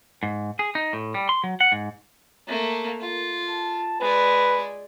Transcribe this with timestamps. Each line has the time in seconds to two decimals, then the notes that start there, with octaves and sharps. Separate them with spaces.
0.23 G#2
0.59 G#4
0.75 D#4
0.93 A2
1.14 G3
1.29 C6
1.44 F#3
1.61 F#5
1.72 G#2
2.48 A3 A#3
3.01 F4
3.49 A5
4.01 G#3 B4 D5